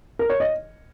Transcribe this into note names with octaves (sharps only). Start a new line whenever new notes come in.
A#4
C#5
D#5